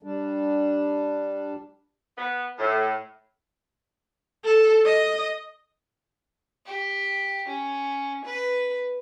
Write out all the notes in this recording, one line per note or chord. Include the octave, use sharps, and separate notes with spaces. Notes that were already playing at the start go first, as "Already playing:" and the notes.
G3 D4
B3
A2
A4
D#5
G4
C#4
B4